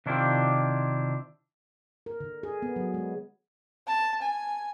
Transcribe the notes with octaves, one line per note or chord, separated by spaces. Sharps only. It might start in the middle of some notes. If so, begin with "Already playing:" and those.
C3 D#3 D4 E4 F4 G4
A#4
D3
G#4
B3
F#3
G#3
A5
G#5